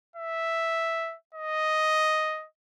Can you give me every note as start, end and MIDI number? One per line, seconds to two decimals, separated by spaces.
0.16 1.15 76
1.34 2.46 75